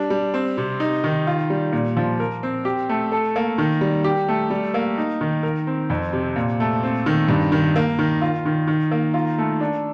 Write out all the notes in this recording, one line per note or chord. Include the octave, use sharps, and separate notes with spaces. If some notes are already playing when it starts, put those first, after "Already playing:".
Already playing: G3 D4
G3
C4
C3
D#4
D#3
F4
G3
A#2
F3
A#4
C4
G4
A3
A4
A#3
D#3
G3
G4
A3
G3
A#3
D#4
D#3
A#4
C4
F2
C3
A#2
A3
C4
D#3
G2
D#3
A#3
D#3
F4
D#3
D#3
A#3
F4
A3
D4